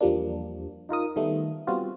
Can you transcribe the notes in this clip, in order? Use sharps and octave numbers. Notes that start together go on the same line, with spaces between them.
E2 F3 G3 A#3 D4
D#4 F4 A#4 D#6
D#3 G3 A3 B3
G3 B3 C4 F4 F#4